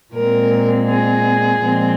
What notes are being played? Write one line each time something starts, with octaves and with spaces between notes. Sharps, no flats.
A#2 G#3 C4 A#4
G#4
A#2 F3 G#3 C4